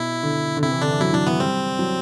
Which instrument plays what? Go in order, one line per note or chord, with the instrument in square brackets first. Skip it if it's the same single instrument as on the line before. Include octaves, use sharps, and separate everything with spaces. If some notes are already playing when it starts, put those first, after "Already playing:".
Already playing: [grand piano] B2 [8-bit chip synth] E4
[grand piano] D3
D3
[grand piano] C3 [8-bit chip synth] E4
[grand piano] E3
[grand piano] D3 [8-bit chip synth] D4
[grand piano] E3
[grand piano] F#3 [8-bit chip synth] E4
[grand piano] F#3 [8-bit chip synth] D4
[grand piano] E3 [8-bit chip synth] B3
[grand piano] G3 [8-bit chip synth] C4
[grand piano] F#3